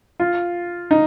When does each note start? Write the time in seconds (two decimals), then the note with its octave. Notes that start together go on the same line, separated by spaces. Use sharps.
0.19 F4
0.91 D#4